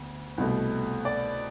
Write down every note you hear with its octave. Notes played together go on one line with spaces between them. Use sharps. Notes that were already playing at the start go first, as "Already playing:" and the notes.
Already playing: D2 B3
C2 B2 A3
D5